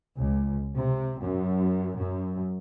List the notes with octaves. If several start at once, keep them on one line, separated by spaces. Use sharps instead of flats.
C#2
C3
F#2
F#2